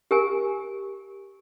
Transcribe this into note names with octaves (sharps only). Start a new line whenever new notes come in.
G4 A#4 G#5